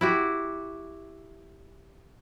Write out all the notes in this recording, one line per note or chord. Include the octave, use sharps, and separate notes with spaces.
E4 F#4 G4